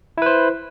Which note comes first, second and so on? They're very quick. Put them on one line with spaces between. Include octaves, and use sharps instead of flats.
E4 B4 C5